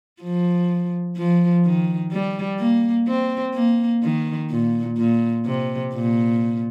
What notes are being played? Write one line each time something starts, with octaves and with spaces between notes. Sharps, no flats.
F3
F3
D#3
G3
A#3
C4
A#3
D#3
A#2
A#2
C3
A#2